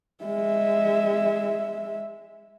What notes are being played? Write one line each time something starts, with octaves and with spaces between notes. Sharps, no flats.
G#3 E5